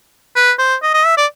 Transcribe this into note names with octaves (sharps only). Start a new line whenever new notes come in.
B4
C5
D#5
D#5
E5
D5